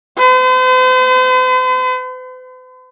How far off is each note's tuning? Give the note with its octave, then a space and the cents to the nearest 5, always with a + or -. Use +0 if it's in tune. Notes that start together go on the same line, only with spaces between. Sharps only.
C5 -45